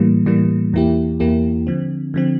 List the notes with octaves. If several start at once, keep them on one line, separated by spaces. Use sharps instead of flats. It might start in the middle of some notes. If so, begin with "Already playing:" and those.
Already playing: A2 E3 G3 A#3
A2 E3 G3 A#3
E2 E3 A#3 E4 G4
E2 E3 A#3 E4 G4
D3 F3 C4
D3 F3 C4